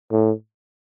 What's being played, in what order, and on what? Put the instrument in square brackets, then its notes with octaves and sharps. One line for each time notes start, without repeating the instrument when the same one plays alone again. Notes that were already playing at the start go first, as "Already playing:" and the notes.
[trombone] A2